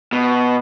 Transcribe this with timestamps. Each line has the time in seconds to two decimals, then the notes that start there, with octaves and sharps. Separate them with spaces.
0.13 B2